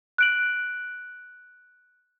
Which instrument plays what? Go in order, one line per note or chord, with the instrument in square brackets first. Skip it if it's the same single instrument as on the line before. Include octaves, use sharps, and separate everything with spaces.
[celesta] F#6 D7 F#7